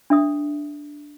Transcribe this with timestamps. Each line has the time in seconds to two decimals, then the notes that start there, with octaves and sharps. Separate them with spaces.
0.10 D4 E5 D#6